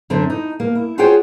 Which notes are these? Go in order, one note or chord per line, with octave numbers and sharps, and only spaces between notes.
F#2 D3 C4 E4
D#4
A#3
E4
F4 F#4 G#4 C5 C#5 G5